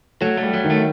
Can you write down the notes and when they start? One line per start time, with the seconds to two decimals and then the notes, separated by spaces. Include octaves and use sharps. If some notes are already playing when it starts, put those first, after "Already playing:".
0.21 F#3 A3
0.37 A3
0.43 G3
0.53 F#3
0.64 D#3
0.70 A3